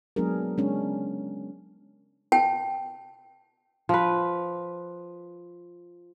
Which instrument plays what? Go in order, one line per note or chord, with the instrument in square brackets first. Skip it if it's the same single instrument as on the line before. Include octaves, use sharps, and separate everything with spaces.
[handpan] F#3 G#3 B3 D4 G#4 A#4
G#3 C#4 D4
[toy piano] G5 A5
[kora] F3 B4